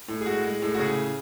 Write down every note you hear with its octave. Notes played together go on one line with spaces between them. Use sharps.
A2
G#4
G#3 F#4
G#3
A2
F#4
C#3 G#4